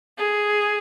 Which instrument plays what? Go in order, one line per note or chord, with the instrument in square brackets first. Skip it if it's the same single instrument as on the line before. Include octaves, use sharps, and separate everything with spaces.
[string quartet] G#4